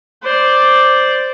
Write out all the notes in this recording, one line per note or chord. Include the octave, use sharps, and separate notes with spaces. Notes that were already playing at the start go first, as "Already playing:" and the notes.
C5 D5